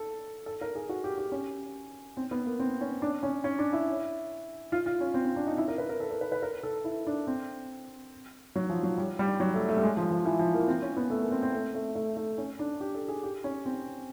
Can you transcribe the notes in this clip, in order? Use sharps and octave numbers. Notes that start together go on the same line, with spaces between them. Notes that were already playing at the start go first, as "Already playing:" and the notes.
Already playing: A4
A4
A#4
G#4
F#4
G4
G4
C#4
C4
B3
A#3
C4
C#4
D4
C#4
C#4
D4
E4
F4
F4
C#4
C4
C4
D4
D#4
E4
A#4
B4
A#4
A4
A#4
B4
B4
A#4
A4
E4
D4
C4
F#3
F3
F#3
G3
G3
F#3
A3
A3
G3
G#3
F3
F3
E3
F3
A#3
C4
C#4
B3
A3
A#3
C4
C4
A3
A3
A3
A3
C#4
D4
G4
A4
G#4
G4
C#4
C4